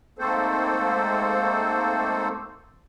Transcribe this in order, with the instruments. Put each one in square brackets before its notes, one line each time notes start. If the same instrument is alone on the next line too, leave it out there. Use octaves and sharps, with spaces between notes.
[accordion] G#2 A3 A#3 C4 A4 C5